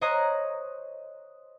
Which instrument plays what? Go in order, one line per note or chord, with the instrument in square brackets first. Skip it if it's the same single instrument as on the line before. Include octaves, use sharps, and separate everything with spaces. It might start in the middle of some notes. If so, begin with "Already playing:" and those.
[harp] C5 C#5 D#5 A#5 D#6 F#6